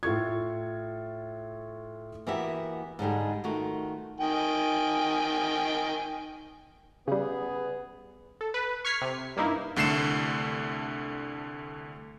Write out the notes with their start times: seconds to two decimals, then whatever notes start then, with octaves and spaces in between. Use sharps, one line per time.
0.03 A2 F4 A4 C#6 G#6
2.27 E3 A#3 B3 F#4 G4 E5
2.99 G#2 D3 G3 G#3
3.44 D#3 A3 F4 F#4
4.20 D#3 G5 G#5
7.08 C#3 G3 B3 G#4
8.41 A4
8.54 B4
8.85 C#6 F6 G#6 B6 C7
9.02 C3
9.37 G2 A#3 D#4 E4
9.76 C2 D3 A3 C7 E7